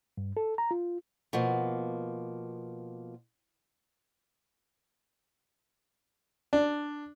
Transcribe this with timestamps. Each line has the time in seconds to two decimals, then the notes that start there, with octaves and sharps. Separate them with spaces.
0.18 G2
0.37 A4
0.58 A#5
0.71 F4
1.33 B2 F3 A#3
6.53 D4